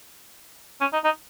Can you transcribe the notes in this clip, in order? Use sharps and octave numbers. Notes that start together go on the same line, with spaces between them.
C#4
D#4
D#4